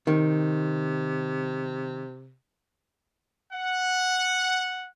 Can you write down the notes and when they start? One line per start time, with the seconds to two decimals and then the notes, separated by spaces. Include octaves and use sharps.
0.07 C3 D#3
3.53 F#5